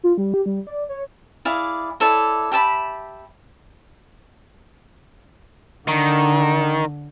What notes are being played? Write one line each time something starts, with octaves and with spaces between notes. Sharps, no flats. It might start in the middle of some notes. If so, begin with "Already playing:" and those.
F4
G3
G4
G3
D5
C#5
E4 G#4 D5 F5
E4 A4 C#5 D5
G4 E5 A5 B5
D3 D#3